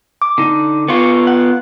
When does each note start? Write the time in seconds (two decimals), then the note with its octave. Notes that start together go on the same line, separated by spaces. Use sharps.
0.22 D6
0.38 D3 D#4
0.88 B3 F4 C#6
1.27 F#5